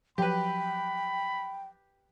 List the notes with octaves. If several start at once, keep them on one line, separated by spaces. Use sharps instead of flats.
F3 F#3 G4 B4 G5 B5